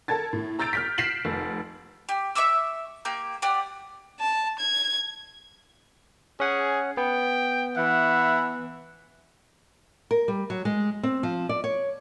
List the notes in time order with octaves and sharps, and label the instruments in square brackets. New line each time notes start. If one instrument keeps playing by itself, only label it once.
[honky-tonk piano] A4 A#4 A5 G#6 A6
A2
A#5 E6 G6 A6 D7
F6 G6 B6
B6 C7 D7 E7 F#7
F1
[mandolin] G4
E5 C#6 D6 E6
A#3 G4 G6
G4 D5 F#5
[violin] A5
G#6
[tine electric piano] C#4 F#5 [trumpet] G#4
[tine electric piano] B3 [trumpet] G5
[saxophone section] E3 [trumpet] E5 [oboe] F#5
[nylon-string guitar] A#4
G3
F#3
G#3
C4
F3
D5
C#5